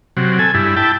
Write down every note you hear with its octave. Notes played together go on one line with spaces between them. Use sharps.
C3 F#3
A4 G#5
G2 E4
E4 G5 A5